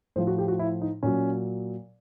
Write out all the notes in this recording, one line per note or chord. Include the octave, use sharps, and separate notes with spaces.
A2 F3 C5
F#4
G4
F#4
E4
D#4
A#2 F#3 C#4